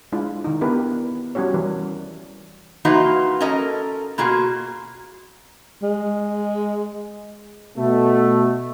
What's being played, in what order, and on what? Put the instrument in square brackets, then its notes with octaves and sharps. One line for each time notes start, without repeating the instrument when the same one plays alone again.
[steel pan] G#3 D4 E4 F4
D#3 D#4
B3 D4 E4 G4 A#4 B4
G3 C#4 F#4 G4 C#5
E3 G3 A#4
[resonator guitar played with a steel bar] E3 A#3 D#4 F4 F#4 B4
C#4 A4 A#4 D#5
B2 A#3 F4 F#4 G#4
[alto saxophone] G#3
[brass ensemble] B2 A3